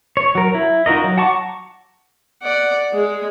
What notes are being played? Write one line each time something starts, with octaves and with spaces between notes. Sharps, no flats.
C#5
F#3 A#4
E4
D#4 F4 F#4 A#4 D#5
F#3
F#5 A5 A#5 C#6 D6
D5 F#5
G#3